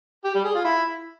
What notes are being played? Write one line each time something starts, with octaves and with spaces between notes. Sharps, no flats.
G4
G3
G#4
F4
E4